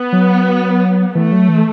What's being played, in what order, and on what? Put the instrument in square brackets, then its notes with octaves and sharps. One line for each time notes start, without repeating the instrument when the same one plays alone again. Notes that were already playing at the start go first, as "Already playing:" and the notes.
Already playing: [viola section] B3
[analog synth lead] F#3
[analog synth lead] E3 [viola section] A3
[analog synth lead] F#3
E3